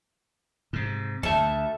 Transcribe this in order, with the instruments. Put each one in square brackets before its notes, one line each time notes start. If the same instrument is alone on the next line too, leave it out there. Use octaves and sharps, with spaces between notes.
[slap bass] G#2 C3
[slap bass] D2 [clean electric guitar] A4 E5 [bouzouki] A5